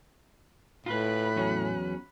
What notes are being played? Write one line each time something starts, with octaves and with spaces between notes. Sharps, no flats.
A2 F4 B4 B5 F#6
E2 F#3 C#4